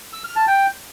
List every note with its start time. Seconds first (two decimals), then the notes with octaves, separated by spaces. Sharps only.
0.13 E6
0.24 F6
0.36 A5
0.47 G5